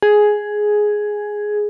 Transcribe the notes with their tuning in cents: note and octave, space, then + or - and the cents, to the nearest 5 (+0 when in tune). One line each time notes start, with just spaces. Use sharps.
G#4 +5